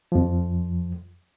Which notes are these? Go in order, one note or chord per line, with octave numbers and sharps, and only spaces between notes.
F2 F3